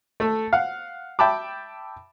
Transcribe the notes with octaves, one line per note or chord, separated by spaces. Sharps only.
A3 A4
F5 F#5
E5 G5 A5 B5 D6